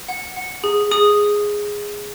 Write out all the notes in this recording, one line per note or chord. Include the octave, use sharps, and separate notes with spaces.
F#5
F#5
G#4
G#4 D#6